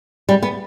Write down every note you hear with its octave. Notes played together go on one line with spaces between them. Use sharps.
G3
B3